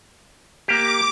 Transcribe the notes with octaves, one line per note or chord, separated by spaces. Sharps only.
A#3 G4 D6